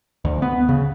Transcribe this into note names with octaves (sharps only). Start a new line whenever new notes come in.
D2
B3
C#3